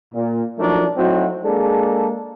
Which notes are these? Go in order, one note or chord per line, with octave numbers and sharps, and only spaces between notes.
A#2
F3 F#3 A3 D4 D#4 A#4
F#3 A3 C4 D#4 E4 F#4
G#3 A#3 D4 G#4 A4